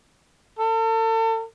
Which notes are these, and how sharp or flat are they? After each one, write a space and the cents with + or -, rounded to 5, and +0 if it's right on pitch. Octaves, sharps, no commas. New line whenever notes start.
A4 +40